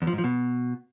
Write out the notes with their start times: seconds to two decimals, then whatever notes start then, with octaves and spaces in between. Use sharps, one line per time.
0.02 E2
0.07 F3
0.13 G#2
0.18 F3
0.24 B2